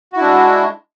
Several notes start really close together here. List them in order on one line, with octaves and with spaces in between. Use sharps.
F#4 E4 D4 G#3